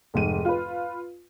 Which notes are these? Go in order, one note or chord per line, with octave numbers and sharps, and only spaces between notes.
F1 G#2 D#7
F4 B4